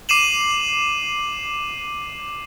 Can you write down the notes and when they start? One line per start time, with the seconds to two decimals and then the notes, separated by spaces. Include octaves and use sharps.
0.09 D6 C7 D#7 E7 F#7